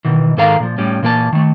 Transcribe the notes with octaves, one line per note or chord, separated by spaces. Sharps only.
B2 D#3 E3
G#2 D#3 A4 A#4 F5 A#5
A#2 F3
A2 G3 C#4
A#2 E3 A#3 A4 A5
D#3 A3